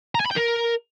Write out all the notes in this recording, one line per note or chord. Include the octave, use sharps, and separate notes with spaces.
A#5
G#5
B5
G5
A#4